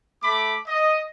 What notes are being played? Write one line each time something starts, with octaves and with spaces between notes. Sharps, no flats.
A3 B5 D6
D#5